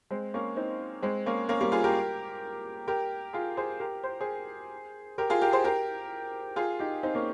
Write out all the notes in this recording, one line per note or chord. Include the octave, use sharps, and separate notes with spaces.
G#3 C4
A#3 C#4
C4 D#4
G#3 C4
A#3 C#4
A#3 C#4
G3 A#3
F4 G#4
G4 A#4
G4 A#4
F4 G#4
G#4 C5
G4 A#4
C5
G#4 C5
G4 A#4
F4 G#4
G4 A#4
G#4 C5
G4 A#4
F4 G#4
D#4 G4
C4 D#4
A#3 C#4